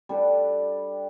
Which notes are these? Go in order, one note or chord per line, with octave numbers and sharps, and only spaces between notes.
G3 D4 A4 B4